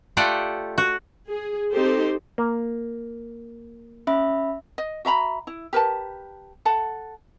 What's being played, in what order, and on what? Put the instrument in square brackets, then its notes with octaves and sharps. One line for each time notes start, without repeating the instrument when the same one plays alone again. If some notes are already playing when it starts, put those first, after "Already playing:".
[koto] A3 F4 G4 A4 D5 F#5
F#4
[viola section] G#4
C4 D#4 G4 A4 C5
[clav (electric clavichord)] A#3
[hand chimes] C#4 E5 B5
[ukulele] D#5
F#4 E5 A#5 B5
E4
G4 A#4 B4 A5
A4 F#5 A5